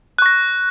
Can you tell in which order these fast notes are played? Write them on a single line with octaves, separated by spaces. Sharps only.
F#6 C#6 A#6